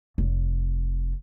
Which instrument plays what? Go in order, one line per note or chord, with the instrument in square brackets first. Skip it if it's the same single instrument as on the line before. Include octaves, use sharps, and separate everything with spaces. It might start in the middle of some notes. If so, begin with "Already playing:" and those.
[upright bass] F1